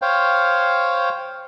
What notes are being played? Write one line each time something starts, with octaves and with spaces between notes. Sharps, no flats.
C5 C#5 F5 G5